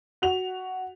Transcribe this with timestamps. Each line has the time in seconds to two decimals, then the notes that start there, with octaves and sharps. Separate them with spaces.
0.22 F#4 F7